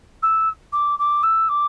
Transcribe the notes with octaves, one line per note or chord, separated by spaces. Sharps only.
E6
D6
D6
E6
D6